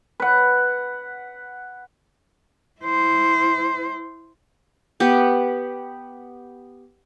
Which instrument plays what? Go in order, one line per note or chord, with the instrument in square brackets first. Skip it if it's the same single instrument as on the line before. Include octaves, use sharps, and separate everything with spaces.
[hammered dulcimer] B4 F#5
[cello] E4 C5
[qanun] B3 G4